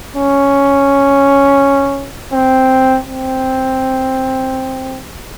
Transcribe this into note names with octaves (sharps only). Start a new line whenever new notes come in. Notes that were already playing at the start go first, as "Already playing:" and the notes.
C#4
C4
C4